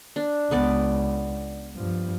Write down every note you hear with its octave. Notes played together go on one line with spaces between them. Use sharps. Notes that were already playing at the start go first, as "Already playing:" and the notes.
D4
C#2 B3 B4 D5
G2 F3